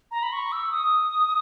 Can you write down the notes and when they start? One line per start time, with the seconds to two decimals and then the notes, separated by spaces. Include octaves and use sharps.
0.11 A#5
0.23 B5
0.32 C#6
0.52 E6
0.71 D#6